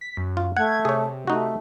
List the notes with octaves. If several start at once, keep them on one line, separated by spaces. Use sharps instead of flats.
B6
F#2
F4
A3 F#5 G#6
C3 G#4 C#5
A3 D#4 F#4